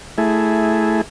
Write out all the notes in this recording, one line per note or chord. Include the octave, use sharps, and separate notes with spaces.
A3 E4 G#4